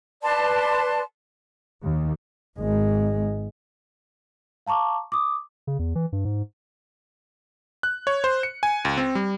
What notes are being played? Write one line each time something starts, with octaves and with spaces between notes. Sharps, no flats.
B4 D5 A5 C6
D#2
G#1 G#3
F5 A5 A#5 C#6 D6
D6 D#6
C#3
E2
E3
G2
G#2
F#6
C#5
C5
C#7
G#5
C#2
C4
G3